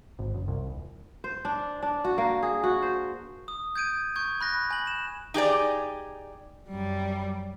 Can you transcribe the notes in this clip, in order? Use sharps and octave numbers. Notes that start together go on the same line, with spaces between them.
G#1
F#1
C2
D#1
C5
D4
D4
F#4
A#3
G#4
F#4
C5
D#6
G6 G#6 D7 D#7
C#6 G6 G#6
B5 F#6 A#6
G#5 F#7
E7
D#4 G4 G#4 D5
F#2 G3